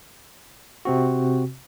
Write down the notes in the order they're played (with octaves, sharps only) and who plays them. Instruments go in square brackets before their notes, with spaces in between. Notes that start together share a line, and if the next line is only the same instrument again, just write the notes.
[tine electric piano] C3 C4 F#4